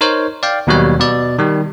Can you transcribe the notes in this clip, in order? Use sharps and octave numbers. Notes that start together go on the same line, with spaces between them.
D#4 A#4 C5 C#5
D5 F5 G5
D#2 B2 F#3 G3 C#5
B2 D5
D#3 G3